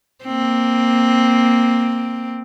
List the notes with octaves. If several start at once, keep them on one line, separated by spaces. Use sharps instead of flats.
A#3 C4